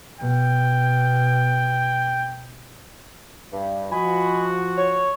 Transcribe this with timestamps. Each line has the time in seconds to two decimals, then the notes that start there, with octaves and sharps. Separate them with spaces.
0.20 B2 G5
3.53 G2
3.92 F3 F#4 D#5 G#5 B5
4.78 C#5